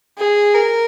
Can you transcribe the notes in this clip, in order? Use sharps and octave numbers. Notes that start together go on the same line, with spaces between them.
G#4
A#4